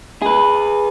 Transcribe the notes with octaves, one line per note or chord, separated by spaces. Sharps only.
G#4 B4